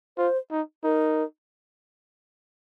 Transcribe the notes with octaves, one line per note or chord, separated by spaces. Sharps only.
F4 C5
D#4
D#4 A#4